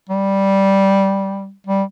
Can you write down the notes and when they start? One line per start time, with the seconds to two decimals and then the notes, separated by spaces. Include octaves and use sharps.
0.09 G3
1.67 G3